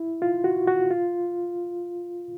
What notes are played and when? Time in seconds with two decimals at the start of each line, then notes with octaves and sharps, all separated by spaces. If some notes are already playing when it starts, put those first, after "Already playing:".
Already playing: E4
0.22 F4
0.44 F#4
0.67 F#4
0.90 F4